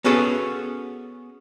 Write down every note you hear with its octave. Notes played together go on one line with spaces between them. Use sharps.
B3 C#4 F#4 G#4 A4